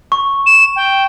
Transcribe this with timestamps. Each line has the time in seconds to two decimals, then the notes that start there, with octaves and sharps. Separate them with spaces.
0.12 C#6
0.46 E7
0.76 G5